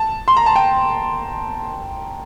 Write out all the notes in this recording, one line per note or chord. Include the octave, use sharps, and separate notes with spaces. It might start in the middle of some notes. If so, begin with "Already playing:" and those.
Already playing: A5
C6
A#5
A5
G5